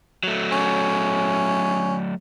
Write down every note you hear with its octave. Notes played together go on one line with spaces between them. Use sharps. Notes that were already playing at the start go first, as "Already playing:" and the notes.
F#3 A3
C#4